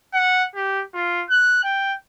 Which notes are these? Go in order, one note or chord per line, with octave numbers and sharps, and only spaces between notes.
F#5
G4
F4
F#6
G5